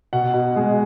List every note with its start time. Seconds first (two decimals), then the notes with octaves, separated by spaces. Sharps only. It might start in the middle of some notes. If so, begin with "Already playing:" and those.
0.13 B2 F#5
0.34 B2
0.56 G#3